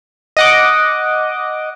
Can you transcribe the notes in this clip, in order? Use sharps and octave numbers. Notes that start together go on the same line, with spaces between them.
D#5 F#5 D6